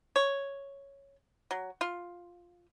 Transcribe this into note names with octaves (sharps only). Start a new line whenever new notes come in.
C#5
F#3
F4